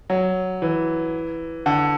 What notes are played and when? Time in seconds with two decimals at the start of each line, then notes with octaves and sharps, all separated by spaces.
0.10 F#3
0.62 E3
1.66 D3